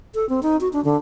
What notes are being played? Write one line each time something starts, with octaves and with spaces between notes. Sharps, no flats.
A4
C4
D#4
F#4
D4
D3